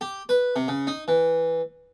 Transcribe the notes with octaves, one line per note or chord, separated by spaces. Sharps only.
G4
B4
C3
C#3
D#4
E3